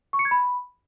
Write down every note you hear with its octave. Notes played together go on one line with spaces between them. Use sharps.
C#6
C#7
G#6
B5